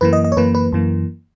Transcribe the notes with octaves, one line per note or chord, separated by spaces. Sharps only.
F#2 E3 A#3 B4
D#5
D#5
C#5
F#2 E3 A#3 B4
B4
F#2 E3 A#3